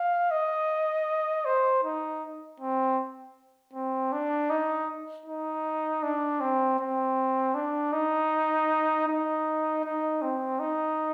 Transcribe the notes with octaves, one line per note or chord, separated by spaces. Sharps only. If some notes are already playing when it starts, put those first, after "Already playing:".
Already playing: F5
D#5
C5
D#4
C4
C4
D4
D#4
D#4
D4
C4
C4
D4
D#4
D#4
D#4
C4
D#4